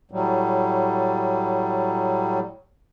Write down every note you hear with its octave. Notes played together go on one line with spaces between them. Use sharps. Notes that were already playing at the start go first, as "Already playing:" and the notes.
A2 F#3 G3